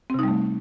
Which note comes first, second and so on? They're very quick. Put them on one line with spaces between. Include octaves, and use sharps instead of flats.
C4 C3 D#4 G3 A3